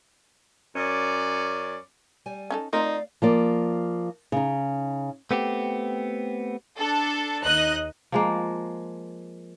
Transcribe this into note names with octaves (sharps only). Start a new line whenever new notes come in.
F#2 C#4 D5
G3 G#5
C#4 D#4 A4
A3 C4 D#4 F4 A#4 D5 F5
F3 A#3 D5
C#3 D#4
A3 B3 C4 G4
D4 A4
D#2 D#4 D#5 F#6
F3 G#3 A#3